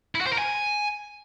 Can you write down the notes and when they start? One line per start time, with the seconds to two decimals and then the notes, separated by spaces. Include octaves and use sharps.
0.15 E4
0.21 F#4
0.27 C5
0.33 A#4
0.38 G#5